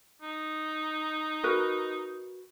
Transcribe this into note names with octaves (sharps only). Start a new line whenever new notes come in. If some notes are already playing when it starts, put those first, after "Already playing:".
D#4
F#4 A#4 B4